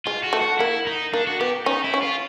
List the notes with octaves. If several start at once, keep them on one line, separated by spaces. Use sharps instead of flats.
G#3 F4
F#4
A3
F#4
A#3 E4
D#4
A#3 D4
F#4
B3 G4
C#4 D#4
E4
C#4
F4